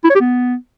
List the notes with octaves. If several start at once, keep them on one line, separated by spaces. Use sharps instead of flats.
E4
C#5
G4
B3